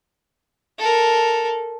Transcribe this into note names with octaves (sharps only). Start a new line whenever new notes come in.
A4 A#4